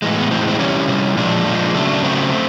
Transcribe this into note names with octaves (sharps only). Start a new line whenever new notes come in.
A2 E3 G#3
B3
A2 E3 G#3 C4
C4
C3 E3 G3 C#4
C3 E3 G3
A#2 F3 G#3 D4
A#2 F3 G#3
C#3 F#3 A3 D4
D4
C#3 F#3 A3 C4
A3